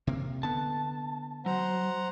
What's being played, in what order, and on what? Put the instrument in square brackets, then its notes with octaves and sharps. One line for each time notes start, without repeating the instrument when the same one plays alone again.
[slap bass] C3 A#3
[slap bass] D3 B3 [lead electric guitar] A5
[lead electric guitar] F#3 [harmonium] C5 F#5 A#5